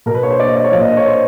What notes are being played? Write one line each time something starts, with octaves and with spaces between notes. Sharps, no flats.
B2 A#4
B4
C#5
C5
D5
D#5
D5
C#5
A#2 F3 D5 D#5
D#5
C#5
C5